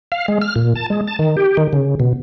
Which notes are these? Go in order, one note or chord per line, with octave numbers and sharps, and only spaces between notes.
F5
G#3
F6
A#2
A5
G#3
A5
D#3
G4
D#3
C#3
B2